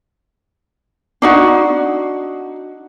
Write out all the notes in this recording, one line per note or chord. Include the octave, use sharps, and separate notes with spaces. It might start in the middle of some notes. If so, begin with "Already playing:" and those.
D4 D#4 F#4